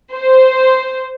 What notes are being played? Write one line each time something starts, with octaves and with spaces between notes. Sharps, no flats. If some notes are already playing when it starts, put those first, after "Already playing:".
C5